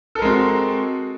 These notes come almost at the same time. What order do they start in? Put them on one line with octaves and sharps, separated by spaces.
A4 A#4 G#3 C4 F#4